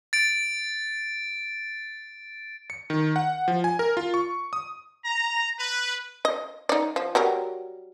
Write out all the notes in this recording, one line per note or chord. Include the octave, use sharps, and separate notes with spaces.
A6 D7
C#7
D#3
F#5
F3
G#5
A#4
F4
C#6
D#6
A#5
B4
D#5
D#4 D5
F3
F#3 G3 A#4